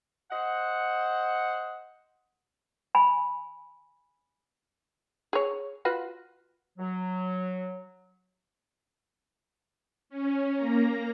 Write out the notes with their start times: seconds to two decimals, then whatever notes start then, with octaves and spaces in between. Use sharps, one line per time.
0.31 C5 D#5 F#5
2.95 G#5 B5
5.33 G#4 C#5
5.85 F4 F#4 B4
6.78 F#3
10.10 C#4
10.56 A#3 A#5